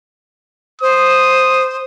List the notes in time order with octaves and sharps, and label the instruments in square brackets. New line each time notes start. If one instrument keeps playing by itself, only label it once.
[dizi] C5 [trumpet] D#6